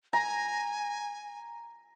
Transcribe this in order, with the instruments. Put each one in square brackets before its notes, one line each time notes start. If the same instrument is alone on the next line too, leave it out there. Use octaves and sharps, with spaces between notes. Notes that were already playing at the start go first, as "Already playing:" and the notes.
[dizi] G#5 [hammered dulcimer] A#5